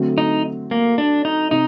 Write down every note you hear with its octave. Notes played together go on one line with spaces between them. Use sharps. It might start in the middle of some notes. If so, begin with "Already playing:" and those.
Already playing: D3 F#3 A3 C4
D#4
A#3
D4
D#4
C3 D#4